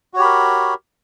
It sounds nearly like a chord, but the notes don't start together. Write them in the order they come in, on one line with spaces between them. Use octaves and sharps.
F#4 C#5 G4 B5 A#4